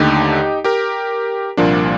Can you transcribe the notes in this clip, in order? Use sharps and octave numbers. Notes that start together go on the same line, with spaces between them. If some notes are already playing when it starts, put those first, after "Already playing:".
Already playing: D#2 D3 A3 D#4 G4
G4 A#4
C2 A#2 F3 A#3 D4